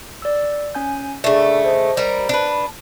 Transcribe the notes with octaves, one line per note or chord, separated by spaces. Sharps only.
D5 E6
C#4 G#5 G6
C#3 A3 D4 A4 D5
C5 D#5
G3 A#4
D4 B4